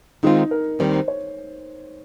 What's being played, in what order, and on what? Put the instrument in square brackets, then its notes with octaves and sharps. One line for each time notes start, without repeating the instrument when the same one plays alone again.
[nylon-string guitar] D#3 G#3 C4 F4 [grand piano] D#4
[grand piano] A#4
[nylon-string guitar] D#2 D#3 G3 C4 [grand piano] C5
[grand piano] C#5